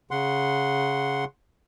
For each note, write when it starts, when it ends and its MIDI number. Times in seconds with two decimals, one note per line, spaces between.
0.11 1.25 49
0.11 1.25 78
0.11 1.25 84